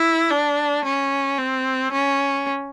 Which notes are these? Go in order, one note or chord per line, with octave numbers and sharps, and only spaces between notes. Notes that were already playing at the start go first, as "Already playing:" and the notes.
Already playing: E4
D4
C#4
C4
C#4